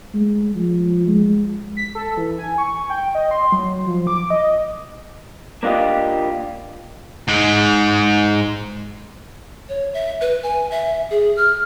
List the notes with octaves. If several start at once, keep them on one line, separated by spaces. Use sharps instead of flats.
G#3
F3
G#3
B6
A4
E3
G#5
C#6
G5
D#5
C6
F#3
F3
D6
D#5
A#3 D4 F4 G4 D#5
G#2 G#3
C#5
E5
B4
G#5
E5
G#4
F6